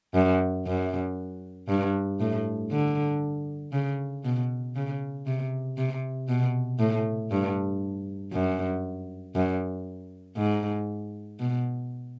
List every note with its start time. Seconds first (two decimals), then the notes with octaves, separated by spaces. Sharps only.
0.15 F#2
0.67 F#2
1.69 G2
2.20 A2
2.71 D3
3.73 C#3
4.24 B2
4.76 C#3
5.27 C3
5.78 C3
6.28 B2
6.79 A2
7.31 G2
8.33 F#2
9.36 F#2
10.37 G#2
11.40 B2